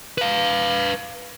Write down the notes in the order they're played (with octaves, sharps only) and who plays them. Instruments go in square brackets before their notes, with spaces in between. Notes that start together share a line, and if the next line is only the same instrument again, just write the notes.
[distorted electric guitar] B4 F5